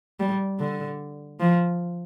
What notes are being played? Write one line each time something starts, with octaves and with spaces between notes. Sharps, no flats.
G3
D3
F3